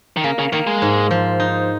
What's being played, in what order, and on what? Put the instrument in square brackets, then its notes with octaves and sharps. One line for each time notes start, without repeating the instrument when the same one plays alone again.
[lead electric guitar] D#3
[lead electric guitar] C#3 [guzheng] A#3
[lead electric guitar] C#3
[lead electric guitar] D#3 [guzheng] A#3
[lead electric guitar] G#3
[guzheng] G#2
F3
D#4